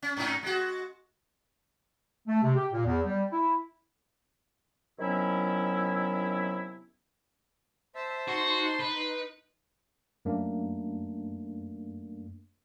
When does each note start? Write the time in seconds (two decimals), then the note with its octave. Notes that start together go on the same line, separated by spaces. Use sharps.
0.02 C#4
0.17 G#2 C#4 D#4
0.43 G#3 F#4
2.28 A3
2.43 C3
2.56 G4
2.72 A#2
2.85 E2
3.05 G3
3.32 E4
4.99 C3 D#3 F#3 B3 C#4 E4
7.95 C5 E5 A5
8.28 D#4 F#4 C6
8.79 B4
10.25 F#2 A3 A#3 D4